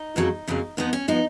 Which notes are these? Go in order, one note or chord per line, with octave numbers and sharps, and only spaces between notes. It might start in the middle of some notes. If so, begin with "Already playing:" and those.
Already playing: D#4
F2 C#3 F#3 A#3
F2 C#3 F#3 A#3
F2 F3 B3 D#4
C#4
F3 B3 D#4